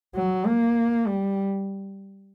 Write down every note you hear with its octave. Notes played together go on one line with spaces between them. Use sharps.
F#3
A#3
G3